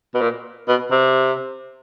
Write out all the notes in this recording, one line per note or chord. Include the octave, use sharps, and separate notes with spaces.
B2
A#2
B2
C3